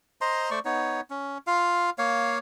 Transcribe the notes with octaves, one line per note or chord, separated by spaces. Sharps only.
C5 D#5 A#5 C6
A3 C5 D5 C#6
B3 D#4 C#5
C#4
F4 F5
A#3 C#5 F5